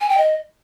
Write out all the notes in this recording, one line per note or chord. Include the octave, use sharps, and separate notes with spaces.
G#5
G5
D#5